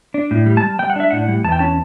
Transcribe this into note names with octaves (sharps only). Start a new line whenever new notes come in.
D4
A2
G3
A5
G3
G3 G5
F#5
D4 E5
A2 F#5
G3
E2 A5
G5
C#4 A5